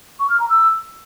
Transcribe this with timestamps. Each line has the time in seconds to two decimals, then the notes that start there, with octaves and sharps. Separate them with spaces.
0.20 C#6
0.30 F6
0.40 A#5
0.50 E6